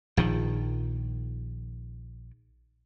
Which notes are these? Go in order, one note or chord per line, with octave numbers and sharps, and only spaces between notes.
A#1 D#3 F3